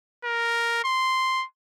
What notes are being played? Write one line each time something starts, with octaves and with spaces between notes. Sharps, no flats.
A#4
C6